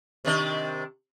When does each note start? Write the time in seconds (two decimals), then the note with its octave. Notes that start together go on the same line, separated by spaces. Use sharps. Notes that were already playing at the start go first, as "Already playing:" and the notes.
0.25 C3 D#3 D4